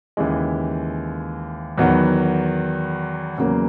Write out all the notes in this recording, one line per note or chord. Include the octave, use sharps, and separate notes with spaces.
D#2 C#3 E3 G#3
E2 D#3 F#3 B3
E2 C#3 F#3 A#3